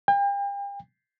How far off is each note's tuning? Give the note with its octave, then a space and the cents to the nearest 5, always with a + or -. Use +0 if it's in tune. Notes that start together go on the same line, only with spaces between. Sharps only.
G5 +40